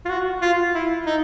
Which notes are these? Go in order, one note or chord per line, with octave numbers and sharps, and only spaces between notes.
F4
F#4
F4
E4
D#4